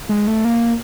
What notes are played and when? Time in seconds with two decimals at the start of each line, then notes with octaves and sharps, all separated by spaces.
0.09 G#3
0.27 A3
0.45 A#3